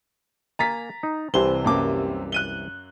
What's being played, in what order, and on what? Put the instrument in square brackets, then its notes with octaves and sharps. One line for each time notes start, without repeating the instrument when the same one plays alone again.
[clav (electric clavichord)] A#3 G#5 [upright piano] A#5 A6 B6
[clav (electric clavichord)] D#4
[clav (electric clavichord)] C2 E3 [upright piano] C3 C5 G7
[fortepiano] F#2 A#3 D6
[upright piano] F#6 D#7 G7